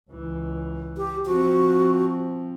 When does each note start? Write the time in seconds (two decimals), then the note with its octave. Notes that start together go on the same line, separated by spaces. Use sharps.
0.10 C#2 E3
0.97 G4
1.26 F3 C4 F#4